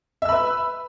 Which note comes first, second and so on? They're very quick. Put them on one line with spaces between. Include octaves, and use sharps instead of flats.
E5 E6 B5 B4